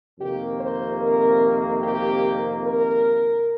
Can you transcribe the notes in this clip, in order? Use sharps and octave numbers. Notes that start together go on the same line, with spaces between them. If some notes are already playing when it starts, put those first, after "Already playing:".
F2 C3 D#3 A#3 G4
C5
A#4
G4
A#4